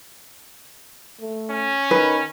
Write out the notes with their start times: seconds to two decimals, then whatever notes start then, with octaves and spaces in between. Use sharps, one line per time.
1.20 A3
1.50 C#4
1.91 D#3 B4